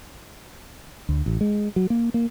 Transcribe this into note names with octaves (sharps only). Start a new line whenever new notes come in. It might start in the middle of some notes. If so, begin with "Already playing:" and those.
D2
A1
G#3
F#3
A#3
A#3